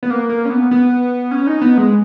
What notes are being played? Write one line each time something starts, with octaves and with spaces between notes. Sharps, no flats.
B3
A#3
A#3
C#4
B3
B3
C#4
D#4
B3
G#3